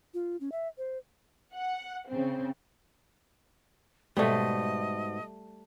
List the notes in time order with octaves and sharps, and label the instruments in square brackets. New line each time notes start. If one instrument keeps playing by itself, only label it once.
[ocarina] F4
C#4
E5
C5
[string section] F#5
C#3 C4
[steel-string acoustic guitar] G#2 B2 [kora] G3 A3 [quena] D#5